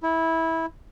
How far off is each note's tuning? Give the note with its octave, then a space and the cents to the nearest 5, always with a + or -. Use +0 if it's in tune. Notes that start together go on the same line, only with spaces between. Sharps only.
E4 -15